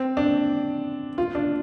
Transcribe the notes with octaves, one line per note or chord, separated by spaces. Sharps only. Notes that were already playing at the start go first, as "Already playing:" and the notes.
Already playing: C4
D4
F4
D4